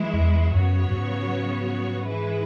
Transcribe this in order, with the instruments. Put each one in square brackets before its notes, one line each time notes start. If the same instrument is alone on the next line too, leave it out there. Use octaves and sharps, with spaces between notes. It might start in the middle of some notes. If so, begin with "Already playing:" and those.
Already playing: [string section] E3 G#3 E4
[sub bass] E2
[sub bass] F#2 [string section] C#3 F#3 B3 F#4 C#5
[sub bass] G#2
[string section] E3 G#3 E4 B4